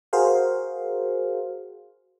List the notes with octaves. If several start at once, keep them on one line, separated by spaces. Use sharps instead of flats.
F#4 G#4 A#4 C5 F5